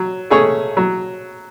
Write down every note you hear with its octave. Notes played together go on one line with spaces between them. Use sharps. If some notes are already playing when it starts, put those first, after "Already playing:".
Already playing: F#3
A3 C#4 G#4 C#5
F#3